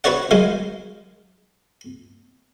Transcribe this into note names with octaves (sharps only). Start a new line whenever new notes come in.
F#4 B4 C#5 D5 F#5
D#3 F#3 G#3 F5